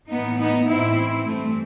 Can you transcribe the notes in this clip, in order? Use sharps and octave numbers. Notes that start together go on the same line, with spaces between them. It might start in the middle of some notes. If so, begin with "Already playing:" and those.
A2 E3 B3 D#4
B3 D#4
A2 E3 C4 E4
G2 E3 A3 C4